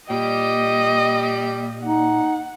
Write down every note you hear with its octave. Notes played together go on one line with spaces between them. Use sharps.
A#2 G3 D#5 G5
D#4 F#5